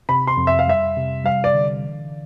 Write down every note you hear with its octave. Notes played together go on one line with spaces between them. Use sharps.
C3 B5
C6
F2
E5
F5
G3 E5
C3
G3 F5
D5
D3
E3